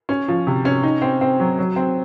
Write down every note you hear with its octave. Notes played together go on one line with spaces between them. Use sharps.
C#4
F3
C3
C#4
D#4
C4
C4
F#3
F#3
C4